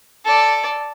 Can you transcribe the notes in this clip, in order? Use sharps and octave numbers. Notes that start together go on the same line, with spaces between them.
A4 D5